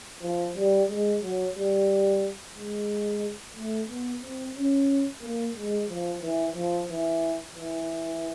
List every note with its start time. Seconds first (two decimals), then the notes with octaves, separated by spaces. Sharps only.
0.21 F3
0.56 G3
0.88 G#3
1.21 F#3
1.55 G3
2.55 G#3
3.55 A3
3.89 B3
4.22 C4
4.55 C#4
5.21 A#3
5.55 G#3
5.88 F3
6.22 E3
6.55 F3
6.89 E3
7.55 E3